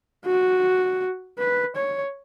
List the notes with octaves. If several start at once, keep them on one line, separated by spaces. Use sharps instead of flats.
F#4
B4
C#5